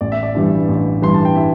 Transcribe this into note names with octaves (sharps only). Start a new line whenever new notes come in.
A1 D5
E5
D5
G2 E3 G3
A1
G2 E3 G3 C6
A5
G5
E4 E5